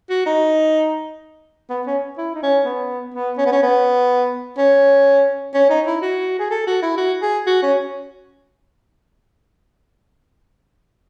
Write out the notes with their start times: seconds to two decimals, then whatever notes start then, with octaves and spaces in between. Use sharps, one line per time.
0.10 F#4
0.26 D#4
1.69 B3
1.87 C#4
2.18 E4
2.35 D#4
2.43 C#4
2.65 B3
3.14 B3
3.37 C#4
3.46 B3
3.52 C#4
3.63 B3
4.58 C#4
5.54 C#4
5.70 D#4
5.87 E4
6.02 F#4
6.39 G#4
6.51 A4
6.67 F#4
6.82 E4
6.98 F#4
7.22 G#4
7.47 F#4
7.62 C#4